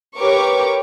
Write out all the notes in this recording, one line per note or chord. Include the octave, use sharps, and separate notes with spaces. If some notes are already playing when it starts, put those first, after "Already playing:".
G4 A#4 B4 C#5 C#6 D6